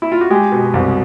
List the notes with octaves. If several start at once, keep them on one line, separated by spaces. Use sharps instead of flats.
E4
F4
F#4
G#3 G4
B2
C2